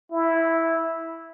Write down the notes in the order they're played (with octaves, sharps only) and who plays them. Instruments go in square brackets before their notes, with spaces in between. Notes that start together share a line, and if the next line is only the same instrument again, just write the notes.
[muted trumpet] E4